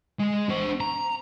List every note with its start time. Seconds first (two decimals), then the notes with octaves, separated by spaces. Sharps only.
0.20 G#3
0.50 D4 C5
0.80 A#5